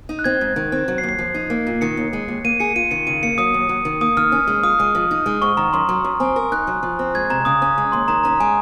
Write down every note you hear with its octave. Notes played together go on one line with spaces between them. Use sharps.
D#4
F#6
C4 G#6
G#2
D#3
C4
F#3
C7
D#2
C7
F3
D#4
A#3
A#2
D#3 C#7
D#2
G#3
D#2
A#3 D#7
G#4 C#7
F4 D#7
D#3 C#7
C#3 D#7
A#3 C#7
F#3 D#6
D#2
F#3
D#3
A#3 D#6
D#3 F6
C#4
G#3
F4 D#6
G#3 D#6
F3
D#4
G#3
G#2 C#6
D#3 A#5
F#2 C6
F#3
F#2
C4 G#5
A#4
D#4 F#6
F#3
F3
C4
G#3 G#6
C3 A#5
C#3 D#6
C#4
G#3
D#2 C6
D#3 A#5
C#4 A#5
G#3 G#5